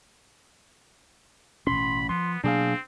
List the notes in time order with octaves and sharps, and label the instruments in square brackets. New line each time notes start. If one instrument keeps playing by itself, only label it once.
[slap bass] A1 B2 C#4 [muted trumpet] B5 [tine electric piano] C6
[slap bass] F3 [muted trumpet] B3 [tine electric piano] C6
[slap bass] B2 F#3 A#3 [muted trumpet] C4 [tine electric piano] D4 G#4 F5